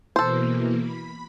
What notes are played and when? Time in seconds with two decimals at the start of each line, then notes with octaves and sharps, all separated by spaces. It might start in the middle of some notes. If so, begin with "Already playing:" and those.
0.16 B2 E3 A#3 A4 C5
0.76 B5